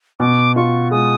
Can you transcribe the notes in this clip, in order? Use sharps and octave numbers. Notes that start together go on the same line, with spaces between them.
B2 D6
F4 C#6
G#3 D#6